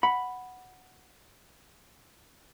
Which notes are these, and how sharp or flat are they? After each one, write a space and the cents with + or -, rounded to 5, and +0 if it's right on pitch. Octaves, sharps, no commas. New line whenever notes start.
F#5 +0 B5 +0